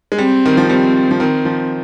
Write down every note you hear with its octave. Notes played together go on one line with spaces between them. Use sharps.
G#3
G3 C4
D#3
F3
G3 C4
F3
D#3 C4
F3